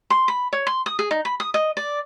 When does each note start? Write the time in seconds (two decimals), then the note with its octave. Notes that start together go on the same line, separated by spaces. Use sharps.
0.10 C6
0.28 B5
0.53 C#5
0.67 C6
0.86 D#6
0.99 G#4
1.11 D#4
1.25 B5
1.40 D#6
1.54 D#5
1.77 D5